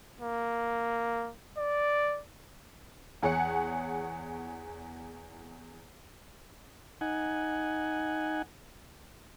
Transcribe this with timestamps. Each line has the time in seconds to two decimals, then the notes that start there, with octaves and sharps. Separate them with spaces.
0.21 A#3
1.58 D5
3.22 E2 G#4 C#5 F#5 C#7
7.01 D#4 F#5 G#5